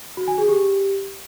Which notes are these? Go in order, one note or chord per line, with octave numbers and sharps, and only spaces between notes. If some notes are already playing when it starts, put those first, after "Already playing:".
F#4
G#5
G#4
G4